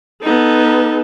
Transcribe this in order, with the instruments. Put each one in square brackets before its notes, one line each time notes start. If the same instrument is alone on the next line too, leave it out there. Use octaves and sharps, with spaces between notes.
[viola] B3 A4 [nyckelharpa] D#4